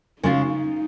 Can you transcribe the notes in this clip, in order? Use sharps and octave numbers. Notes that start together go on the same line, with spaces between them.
C#3 G#3 C#4 D#4 F4